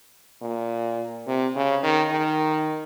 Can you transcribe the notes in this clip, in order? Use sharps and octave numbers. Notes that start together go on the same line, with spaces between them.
A#2
C3
C#3
D#3
D#3